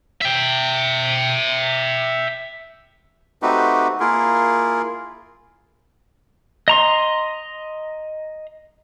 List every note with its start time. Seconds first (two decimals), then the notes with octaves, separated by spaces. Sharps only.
0.21 E5 G5
3.42 A3 C4 D#4 F#4 G4 B4
4.00 A#3 E4 F4 G#4 A#4
6.68 D#5 A#5 C6